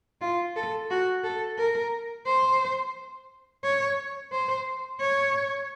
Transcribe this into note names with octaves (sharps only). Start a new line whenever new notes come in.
F4
A4
F#4
A4
A#4
C5
C#5
C5
C#5